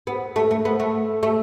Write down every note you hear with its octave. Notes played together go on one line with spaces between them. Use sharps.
B3
A3
A3
B3
A3
A3